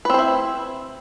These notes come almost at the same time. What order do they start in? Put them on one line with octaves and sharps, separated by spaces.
B4 C4 C5 E4